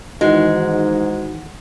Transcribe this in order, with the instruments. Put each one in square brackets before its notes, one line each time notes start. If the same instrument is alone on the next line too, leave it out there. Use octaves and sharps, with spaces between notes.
[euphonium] G#2 [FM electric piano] D#3 E3 F#5 [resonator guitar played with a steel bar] G#3 [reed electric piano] D#4 F#4